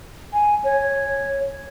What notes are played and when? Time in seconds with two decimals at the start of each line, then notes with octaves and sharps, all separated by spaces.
0.33 G#5
0.64 C#5